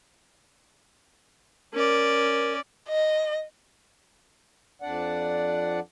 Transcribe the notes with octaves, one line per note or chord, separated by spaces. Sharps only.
C#4 A#4 D5
D#5
F2 D4 D5 F#5